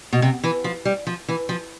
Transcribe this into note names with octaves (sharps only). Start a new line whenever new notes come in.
B2
C3
E3
F3
G3
F3
E3
F3